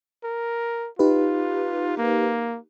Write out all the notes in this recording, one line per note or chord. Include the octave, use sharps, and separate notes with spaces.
A#4
D#4 F4 G4 B4
A#3